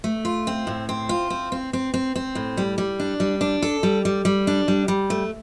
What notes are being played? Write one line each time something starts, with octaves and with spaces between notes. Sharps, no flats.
A3
F4
C4
A2
C4
F4
C4
C4
C4
C4
C4
A2
G3
G3
D4
G3
D4
A4
G3
G3
G3
D4
G3
G3
A3